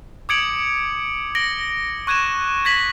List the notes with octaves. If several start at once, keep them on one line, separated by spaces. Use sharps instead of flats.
D6 D#6 G#6 C#7 D7 F#7
A#6 D7 F#7 G7
C#6 F#6 G#6 D#7 E7
G#6 A#6 B6 F#7